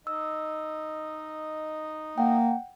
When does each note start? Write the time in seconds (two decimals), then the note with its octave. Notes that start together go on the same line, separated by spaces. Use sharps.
0.07 D#4 D#5 E6
2.18 A#3 F#5 G5